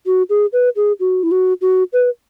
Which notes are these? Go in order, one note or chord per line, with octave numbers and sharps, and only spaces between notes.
F#4
G#4
B4
G#4
F#4
E4
F#4
F#4
B4